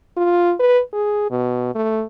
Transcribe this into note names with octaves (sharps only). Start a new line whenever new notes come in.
F4
B4
G#4
B2
A3